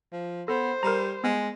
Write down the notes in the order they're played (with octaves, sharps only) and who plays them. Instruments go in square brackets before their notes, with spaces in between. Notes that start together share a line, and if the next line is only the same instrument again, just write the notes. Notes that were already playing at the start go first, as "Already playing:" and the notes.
[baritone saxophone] F3
[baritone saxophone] B3 [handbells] A4 [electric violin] C5
[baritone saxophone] G3 [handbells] A#4 A#5
[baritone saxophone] G#3 [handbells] B3